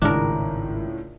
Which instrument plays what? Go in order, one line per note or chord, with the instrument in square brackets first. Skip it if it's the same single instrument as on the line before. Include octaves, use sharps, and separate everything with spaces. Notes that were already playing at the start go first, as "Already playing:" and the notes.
[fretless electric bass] G#1 D#3 G#3 [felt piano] C#2 A2 [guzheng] D4 A#4